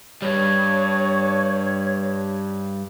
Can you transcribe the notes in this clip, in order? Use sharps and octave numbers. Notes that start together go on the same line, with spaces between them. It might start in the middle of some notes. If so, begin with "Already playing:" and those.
G2 G3 C#5